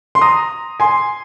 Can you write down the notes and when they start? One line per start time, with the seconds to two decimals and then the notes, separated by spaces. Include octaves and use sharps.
0.15 C6
0.21 A#5 D#6
0.80 G#5 C6